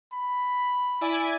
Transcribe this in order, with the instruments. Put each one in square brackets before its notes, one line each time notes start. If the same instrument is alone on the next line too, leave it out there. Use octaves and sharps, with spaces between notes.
[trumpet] B5
[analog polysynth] E4 D5 G#5